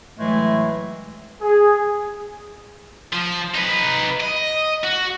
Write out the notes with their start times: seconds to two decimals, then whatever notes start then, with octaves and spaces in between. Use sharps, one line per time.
0.18 A2 E3 F#3 G#3 A3
1.41 G#4
3.13 F3
3.55 D#4 B4
4.21 D#5
4.84 F#4